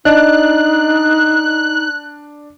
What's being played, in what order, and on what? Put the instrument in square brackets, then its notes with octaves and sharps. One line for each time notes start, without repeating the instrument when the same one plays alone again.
[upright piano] D4 [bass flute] D#4 [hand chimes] D#5 [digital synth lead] F#6